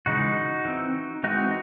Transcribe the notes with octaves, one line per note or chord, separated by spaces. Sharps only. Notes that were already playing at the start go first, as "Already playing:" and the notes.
C#3 E3 G#3 D#4 F#4
E3 C4
E3 G#3 C4 D#4 F#4